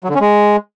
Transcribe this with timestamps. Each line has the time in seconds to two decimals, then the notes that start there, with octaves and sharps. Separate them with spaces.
0.04 F#3
0.09 D3
0.15 C#4
0.20 G#3